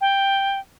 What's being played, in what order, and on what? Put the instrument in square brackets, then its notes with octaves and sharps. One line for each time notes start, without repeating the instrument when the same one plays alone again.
[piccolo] G5